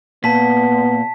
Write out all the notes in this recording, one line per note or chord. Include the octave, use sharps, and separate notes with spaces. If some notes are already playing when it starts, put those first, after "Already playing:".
A#2 B3 A5 B6